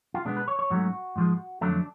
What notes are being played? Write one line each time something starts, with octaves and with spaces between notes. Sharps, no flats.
F4
B2 G#3 B3 D4
B4
C#5
C#5
G#2 F#3 A3 C#4 F#4
G#2 F3 G#3
F2 D3 F#3 A3 D4